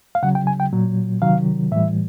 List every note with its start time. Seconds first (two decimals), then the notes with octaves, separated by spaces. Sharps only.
0.15 F5
0.23 C#3 F#3 F#5
0.35 G5
0.47 G#5
0.60 G5
0.73 A#2 F#3
1.22 C3 D#3 F#3 F5
1.71 A2 E3 G3 E5